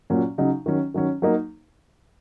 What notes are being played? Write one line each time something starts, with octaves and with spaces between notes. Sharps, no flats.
A#2 F#3 C#4
C#3 F#3 D#4
D#3 F#3 C#4
D#3 F#3 C#4
F#3 A#3 D#4